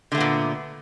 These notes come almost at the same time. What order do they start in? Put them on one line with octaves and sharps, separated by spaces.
D3 A3 B3 A#2